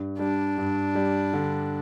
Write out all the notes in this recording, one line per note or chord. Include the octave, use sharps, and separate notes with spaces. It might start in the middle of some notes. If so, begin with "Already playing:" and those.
Already playing: G2
G3 D4
G2
G3
D3